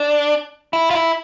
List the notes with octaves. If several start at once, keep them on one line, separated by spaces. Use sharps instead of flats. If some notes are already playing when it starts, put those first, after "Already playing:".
Already playing: D4
E4
F4
E4